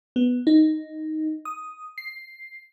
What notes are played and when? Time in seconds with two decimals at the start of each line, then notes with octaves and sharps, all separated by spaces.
0.16 B3
0.47 D#4
1.45 D#6
1.98 C7